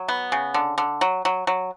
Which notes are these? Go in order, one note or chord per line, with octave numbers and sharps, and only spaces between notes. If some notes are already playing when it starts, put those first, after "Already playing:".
Already playing: F#3
B3
C#3
D3
D3
F#3
F#3
F#3